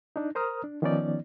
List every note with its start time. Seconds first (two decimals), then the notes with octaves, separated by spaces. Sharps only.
0.16 D4 D#4
0.35 A#4 C5 A#5 D#6 F6
0.64 D4
0.82 D#3 F3 B3 C#4 D#4 D5